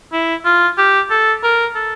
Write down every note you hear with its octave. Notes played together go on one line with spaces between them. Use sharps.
E4
F4
G4
A4
A#4
A4